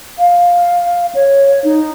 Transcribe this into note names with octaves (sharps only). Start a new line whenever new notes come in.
F5
C#5
D#4